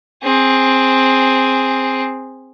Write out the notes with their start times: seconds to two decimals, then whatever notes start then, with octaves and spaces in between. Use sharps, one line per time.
0.23 C4 G#4